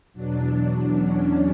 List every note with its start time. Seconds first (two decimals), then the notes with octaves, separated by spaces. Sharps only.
0.13 E2 B2 F#3 D4
0.53 D4
0.91 C#4